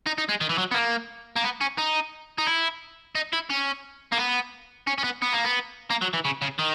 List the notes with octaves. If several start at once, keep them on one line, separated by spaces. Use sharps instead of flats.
D#4
D#4
G#3
D#3
E3
F#3
B3
A#3
A#3
B3
C#4
D#4
D#4
E4
D#4
E4
C#4
A#3
B3
C#4
C#4
B3
B3
A#3
B3
A#3
F#3
E3
C#3
C#3
D#3